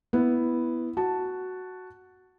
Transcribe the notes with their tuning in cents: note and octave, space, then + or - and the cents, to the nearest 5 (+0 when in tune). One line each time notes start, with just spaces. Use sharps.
B3 +0 E4 +0
F#4 +0 A5 +0